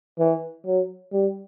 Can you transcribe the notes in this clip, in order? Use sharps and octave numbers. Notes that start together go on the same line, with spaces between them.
E3
F#3
G3